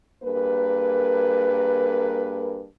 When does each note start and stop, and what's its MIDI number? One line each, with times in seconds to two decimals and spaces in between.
0.23 2.65 43
0.23 2.65 58
0.23 2.65 68
0.23 2.65 70
0.23 2.65 71